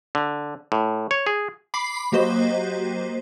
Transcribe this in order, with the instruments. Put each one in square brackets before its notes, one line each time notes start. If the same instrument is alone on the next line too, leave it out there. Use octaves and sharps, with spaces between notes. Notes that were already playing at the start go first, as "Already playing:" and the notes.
[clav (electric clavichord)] D3
A2
C#5
G#4
[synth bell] B5 D6 C7
F#3 A#3 F#4 G4 C5 D#5